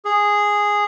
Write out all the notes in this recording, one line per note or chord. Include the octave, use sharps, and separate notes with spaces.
G#4